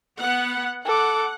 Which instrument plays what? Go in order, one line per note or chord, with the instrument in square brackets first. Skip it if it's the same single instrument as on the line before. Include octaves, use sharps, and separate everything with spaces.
[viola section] B3 F#5
[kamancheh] A4 D6 [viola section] F#5